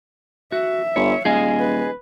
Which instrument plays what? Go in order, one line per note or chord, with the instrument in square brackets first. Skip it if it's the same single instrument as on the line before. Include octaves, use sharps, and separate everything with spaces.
[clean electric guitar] F#4 [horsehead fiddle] E5
[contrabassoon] G1 [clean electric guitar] C#5
[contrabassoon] D#1 [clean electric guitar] G#4 D#5 G#5 [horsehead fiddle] F5
[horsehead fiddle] B4